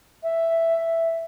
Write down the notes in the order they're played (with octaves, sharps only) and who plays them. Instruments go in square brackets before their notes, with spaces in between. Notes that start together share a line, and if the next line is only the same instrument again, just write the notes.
[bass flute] E5